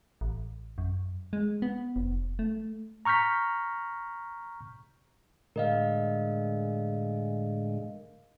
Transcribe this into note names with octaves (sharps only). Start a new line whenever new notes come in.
A1
F#2
G#3
B3
F1
A3
A#5 C#6 F6 G6 B6
A2 D3 G#3 A#4 D#5 F5